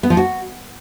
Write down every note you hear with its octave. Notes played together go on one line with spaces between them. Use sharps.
B3
F3
F#4